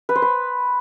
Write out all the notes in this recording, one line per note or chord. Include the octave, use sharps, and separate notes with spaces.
B4
C5
B4